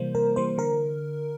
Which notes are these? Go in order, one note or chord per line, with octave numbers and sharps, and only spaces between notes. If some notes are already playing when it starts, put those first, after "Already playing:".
Already playing: C3 E3 G3 A#3 C5
C3 A#4
E3 G3 A#3 C5
D3 A#4